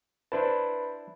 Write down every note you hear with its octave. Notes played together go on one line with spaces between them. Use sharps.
D4 E4 B4 C5 A5